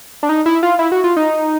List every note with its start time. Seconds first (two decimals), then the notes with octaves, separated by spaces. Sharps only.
0.23 D4
0.29 D#4
0.46 E4
0.63 F4
0.79 E4
0.92 F#4
1.04 F4
1.17 D#4